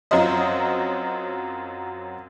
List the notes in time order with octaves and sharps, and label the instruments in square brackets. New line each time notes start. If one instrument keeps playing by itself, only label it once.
[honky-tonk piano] F#2 F#3 C4 F4 C5 D#5